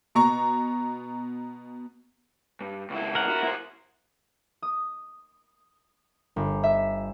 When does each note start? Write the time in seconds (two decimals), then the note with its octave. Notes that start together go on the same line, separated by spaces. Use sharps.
0.15 B2 A#5 C#6
2.61 G2
2.90 C#2 E4
3.15 A#4 F#5
3.29 E4 F#4
3.43 E4 C5
4.62 D#6
6.36 G1
6.63 E5